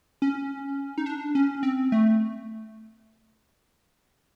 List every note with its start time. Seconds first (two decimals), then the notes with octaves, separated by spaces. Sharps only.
0.22 C#4
0.98 D#4
1.06 D4
1.35 C#4
1.63 C4
1.92 A3